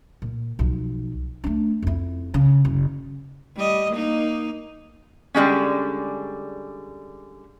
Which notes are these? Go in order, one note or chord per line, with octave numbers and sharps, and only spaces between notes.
A#2
B1 F3
A3 D4
F2 E4
C#3
F#1
G3 D#5
A#3 D#4
D3 G3 G#3 C#4